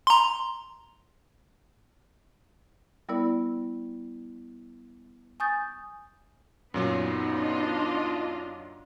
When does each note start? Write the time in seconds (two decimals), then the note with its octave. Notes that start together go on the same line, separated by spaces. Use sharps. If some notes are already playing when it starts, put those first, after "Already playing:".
0.07 A#5 C6
3.09 G3 B3 E4 A#4 D5
5.40 G#5 C#6 D#6 G6 A6
6.74 F#2 A#2 F#3 B3 D#4
7.34 D4 F4 D#5